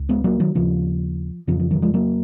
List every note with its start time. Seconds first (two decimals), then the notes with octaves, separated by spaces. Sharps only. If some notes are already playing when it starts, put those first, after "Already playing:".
Already playing: C#2
0.09 G#3 B3
0.24 F#3 A#3
0.40 D#3 F#3
0.55 D#2 C#3 F3
1.47 F2 C#3 F3
1.60 F3
1.71 D#3 F#3
1.82 F3 G#3
1.94 F#3 A#3